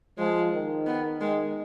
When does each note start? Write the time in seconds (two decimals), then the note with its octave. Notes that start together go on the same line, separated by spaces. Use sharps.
0.18 F3 G#3
0.53 D#3
0.87 B3
1.21 D#3 G#3